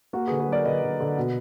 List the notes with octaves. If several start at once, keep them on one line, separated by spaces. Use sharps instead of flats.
A#3 F#4 A#4
D3 G#4 B4
G#4 B4
F#3 A#4 D5
D3 B4 D#5
D3
D3
B2